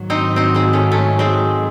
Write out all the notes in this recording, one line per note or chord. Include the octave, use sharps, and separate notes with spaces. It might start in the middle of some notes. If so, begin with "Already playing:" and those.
Already playing: G#2 D#3 F#3
C4 D#4
C4 D#4
G#3 C4
A3 C#4
A3 C#4
G#3 C4